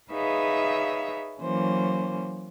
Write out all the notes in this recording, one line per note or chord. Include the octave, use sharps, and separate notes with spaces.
D#4 G#4 B4 C#5 E5 F5
E3 F#3 A#3 C#4 C5